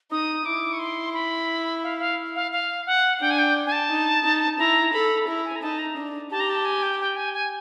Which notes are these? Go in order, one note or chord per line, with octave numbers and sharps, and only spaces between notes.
D#4 D#6
E4 D6
C#6
C6
B5
F5
F5
F5
F5
F#5
D4 G5
G#5
G5
G#5
A5
D#4
D#4
E4 A#5
A4 B5
E4
G#5
A#5
D#4 A5
A#5
D4
G4 A5
A#5
A5
G#5
G5
G5
G#5
G#5